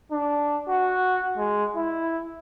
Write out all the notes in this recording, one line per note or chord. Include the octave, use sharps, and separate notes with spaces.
D4
F#4
G#3
E4